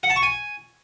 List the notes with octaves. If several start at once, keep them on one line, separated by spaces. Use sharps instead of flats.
F#5
A5
C#6
G#5